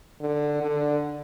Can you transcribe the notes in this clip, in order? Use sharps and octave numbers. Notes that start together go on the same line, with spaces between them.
D3
D3